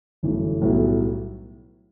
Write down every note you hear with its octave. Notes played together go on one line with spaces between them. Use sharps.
G1 F#2 E3 A3
B1 A2 G3 B3 E4